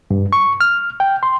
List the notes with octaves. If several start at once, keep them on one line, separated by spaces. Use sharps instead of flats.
G2
C#6
F6
G5
C6